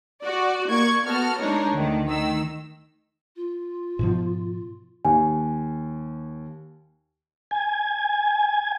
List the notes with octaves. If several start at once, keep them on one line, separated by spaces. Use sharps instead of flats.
F#4 D5
A#3 D5 C#6 G#6
B3 F#4 A4 F6
G#3 D4 D#4 A#4 C#5
D2 D#3
D#3 E6
F4
G#2 B2 F3
D#2 G#5
G#5